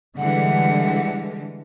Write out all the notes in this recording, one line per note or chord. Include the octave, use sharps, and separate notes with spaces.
D3 E3 G3 G#3 F#5